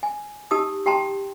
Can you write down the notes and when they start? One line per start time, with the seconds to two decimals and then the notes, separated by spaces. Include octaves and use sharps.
0.03 G#5
0.51 D#4 G4 A5 D#6 E6
0.86 G4 G5 A5 A#5 C6